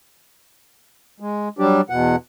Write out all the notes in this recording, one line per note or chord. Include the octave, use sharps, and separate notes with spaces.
G#3
F#3 G3 D4 G4
E2 B2 F#5